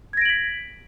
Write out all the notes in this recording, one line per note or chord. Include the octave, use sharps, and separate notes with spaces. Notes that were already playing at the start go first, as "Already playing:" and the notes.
G#6 A#6 B6 D7 F#7